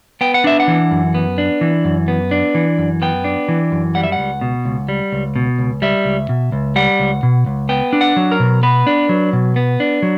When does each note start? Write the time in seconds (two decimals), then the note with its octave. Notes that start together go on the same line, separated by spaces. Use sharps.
0.21 B3 G5
0.34 F#5
0.44 D4 E5
0.60 F#5
0.68 E3
0.91 F#2
1.15 B3
1.38 D4
1.61 E3
1.85 F#2
2.08 B3
2.31 D4
2.55 E3
2.78 F#2
3.02 B3 G5
3.24 D4
3.48 E3
3.72 F#2
3.95 G3 F#5
4.04 E5
4.12 F#5
4.19 C#2
4.41 B2
4.65 C#2
4.89 G3
5.12 C#2
5.36 B2
5.59 C#2
5.82 G3 E5
6.05 C#2
6.29 B2
6.52 C#2
6.76 G3 F#5
7.00 C#2
7.23 B2
7.46 C#2
7.69 B3 G5
7.93 D4
8.01 F#5
8.16 F#3
8.32 A#4
8.40 B2
8.63 B3 B4
8.87 D4
9.09 F#3
9.33 B2
9.56 B3
9.80 D4
10.03 F#3